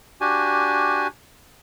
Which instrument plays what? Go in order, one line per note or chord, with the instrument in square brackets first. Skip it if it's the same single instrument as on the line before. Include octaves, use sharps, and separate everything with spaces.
[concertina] D4 F#4 G4 G#5